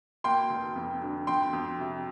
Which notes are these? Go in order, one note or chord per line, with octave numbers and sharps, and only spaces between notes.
A#3 G5 C6
F1
F2
D3
F2 G5 C6
F2
C3